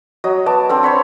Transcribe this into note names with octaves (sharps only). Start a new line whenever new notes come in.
F#3 D#5
B3 A5 D6
C4 D4 A4
C5 C#5 B5 C#6